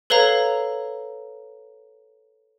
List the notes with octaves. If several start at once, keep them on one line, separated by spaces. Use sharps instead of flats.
A4 B4 C#5 F5 A#5